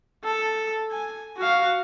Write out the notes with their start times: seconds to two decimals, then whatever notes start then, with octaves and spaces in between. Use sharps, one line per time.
0.25 A4
0.91 G#5
1.37 F#4 F5